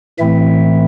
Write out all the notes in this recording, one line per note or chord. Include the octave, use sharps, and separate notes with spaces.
A2 E3 A3 C4 E4 E5